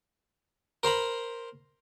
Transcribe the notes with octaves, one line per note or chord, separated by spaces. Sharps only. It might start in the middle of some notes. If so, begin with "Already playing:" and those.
A#4 C5 A#5 B5